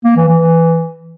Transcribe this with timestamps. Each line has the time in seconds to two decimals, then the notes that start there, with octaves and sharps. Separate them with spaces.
0.04 A#3
0.16 E3
0.28 E3